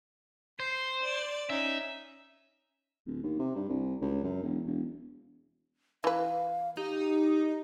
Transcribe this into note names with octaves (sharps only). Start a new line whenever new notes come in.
C5 C7
D5
C#4 D#4 E5
D1
D#2
C3
G2
C2
C#2
F#2
E1
E1
E3 B4 F5
D#4 G4